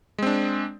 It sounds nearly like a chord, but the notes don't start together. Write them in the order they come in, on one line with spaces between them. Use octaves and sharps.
G#3 C4 D4